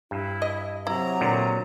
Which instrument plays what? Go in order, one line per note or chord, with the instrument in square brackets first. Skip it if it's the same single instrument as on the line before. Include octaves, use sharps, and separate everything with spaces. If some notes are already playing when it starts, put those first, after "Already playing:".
[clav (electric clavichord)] G2 [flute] E4
[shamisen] D#5
[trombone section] C3 F#3 [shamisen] E4 [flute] A#5
[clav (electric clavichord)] A#2 D3